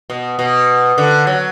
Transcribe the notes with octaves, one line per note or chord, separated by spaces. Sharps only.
B2
B2
D3
F#3